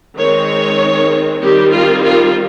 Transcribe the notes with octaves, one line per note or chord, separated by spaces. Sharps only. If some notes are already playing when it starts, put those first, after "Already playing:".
D#3 G#3 C4 C#5
D#3 G3 C4 G4
F4
F4